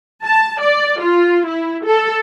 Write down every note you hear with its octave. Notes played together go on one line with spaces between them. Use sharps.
A5
D5
F4
E4
A4